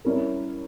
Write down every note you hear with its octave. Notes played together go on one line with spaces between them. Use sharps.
G3 C#4 E4 A#4